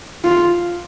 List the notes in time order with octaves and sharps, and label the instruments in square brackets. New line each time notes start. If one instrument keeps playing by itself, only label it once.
[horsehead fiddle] F4